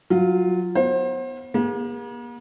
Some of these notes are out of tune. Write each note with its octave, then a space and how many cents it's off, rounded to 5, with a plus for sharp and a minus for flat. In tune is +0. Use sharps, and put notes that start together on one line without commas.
F#3 -15 F4 +0
B3 +0 C5 +30
A#3 +45 G#4 -40